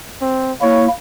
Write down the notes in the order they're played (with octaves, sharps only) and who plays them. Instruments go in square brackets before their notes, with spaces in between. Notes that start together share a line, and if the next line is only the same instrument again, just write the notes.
[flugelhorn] C4
[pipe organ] A#3 E4 [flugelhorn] C#5